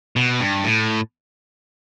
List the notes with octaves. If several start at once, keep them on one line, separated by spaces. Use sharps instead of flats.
B2
G2
A2